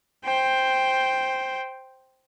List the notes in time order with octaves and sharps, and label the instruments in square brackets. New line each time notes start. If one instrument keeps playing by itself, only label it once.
[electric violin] C5 G5